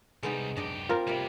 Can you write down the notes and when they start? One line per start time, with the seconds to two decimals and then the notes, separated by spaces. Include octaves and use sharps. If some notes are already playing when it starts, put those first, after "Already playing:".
0.23 C2 G3 G#3 B3 D#4
0.57 F#2 D4 G4 D#5
0.89 C4 F4 A#4
1.07 C3 G3 A#3 B3